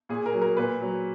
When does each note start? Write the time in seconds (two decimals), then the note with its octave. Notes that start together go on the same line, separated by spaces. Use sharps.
0.09 A#2 G#4
0.26 A#4
0.34 F#3
0.42 A#4
0.57 A#2 B4
0.82 F#3